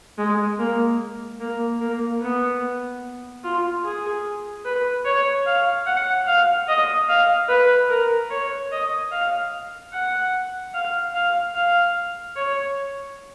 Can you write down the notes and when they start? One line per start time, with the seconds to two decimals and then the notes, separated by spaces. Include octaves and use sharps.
0.18 G#3
0.59 A#3
1.40 A#3
1.80 A#3
2.21 B3
3.43 F4
3.84 G#4
4.65 B4
5.05 C#5
5.46 F5
5.86 F#5
6.27 F5
6.68 D#5
7.09 F5
7.49 B4
7.90 A#4
8.30 C#5
8.71 D#5
9.11 F5
9.93 F#5
10.74 F5
11.14 F5
11.55 F5
12.36 C#5